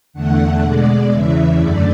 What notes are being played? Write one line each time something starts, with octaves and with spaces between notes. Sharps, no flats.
E2 D3 A3 F#5
B2 G#3 D5
E2 C#3 E3 E5
F#2 D3 A3 D5